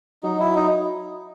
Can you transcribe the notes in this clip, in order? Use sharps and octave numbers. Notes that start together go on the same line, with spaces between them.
F#3 D#4
E4
D#4